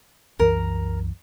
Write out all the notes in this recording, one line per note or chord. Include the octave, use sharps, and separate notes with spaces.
C2 F#2 E3 A#4